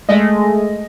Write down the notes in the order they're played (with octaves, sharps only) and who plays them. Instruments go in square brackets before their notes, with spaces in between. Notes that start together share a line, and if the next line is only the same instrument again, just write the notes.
[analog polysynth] G#3 A3 [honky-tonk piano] D#5